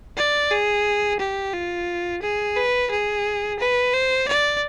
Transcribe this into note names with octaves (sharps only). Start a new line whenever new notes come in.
D5
G#4
G4
F4
G#4
B4
G#4
B4
C5
D5